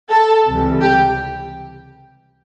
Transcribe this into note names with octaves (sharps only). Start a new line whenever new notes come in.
A4
C#2 C3 E3 G3
G4